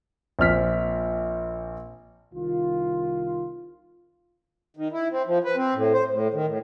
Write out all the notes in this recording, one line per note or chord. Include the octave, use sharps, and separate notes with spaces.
A#1 C4 F6 B6
C2 D#3 F4
D#3
E4
C4
F3
B4
C4
A2
C5
A2
D#3
A2